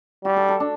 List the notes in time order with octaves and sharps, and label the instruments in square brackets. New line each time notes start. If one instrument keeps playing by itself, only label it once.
[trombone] G3 [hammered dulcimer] F#4
[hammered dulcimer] A4
A4
D4